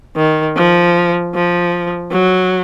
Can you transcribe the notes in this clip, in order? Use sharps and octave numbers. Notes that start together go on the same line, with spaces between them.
D#3
F3
F3
F#3